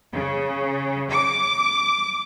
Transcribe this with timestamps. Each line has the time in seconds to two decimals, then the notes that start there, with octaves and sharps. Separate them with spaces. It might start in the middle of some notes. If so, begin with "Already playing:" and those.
0.13 C#3
1.10 D6